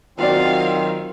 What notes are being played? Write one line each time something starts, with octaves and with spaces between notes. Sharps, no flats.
D#3 F#3 C4 F4 F#4 D5 F5